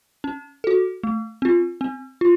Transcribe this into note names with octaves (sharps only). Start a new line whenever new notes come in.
C#4
F#4 A4
A3
C4 F4
C4
F4